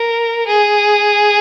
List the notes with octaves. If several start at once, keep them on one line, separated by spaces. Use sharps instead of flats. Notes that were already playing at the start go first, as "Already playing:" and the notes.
Already playing: A#4
G#4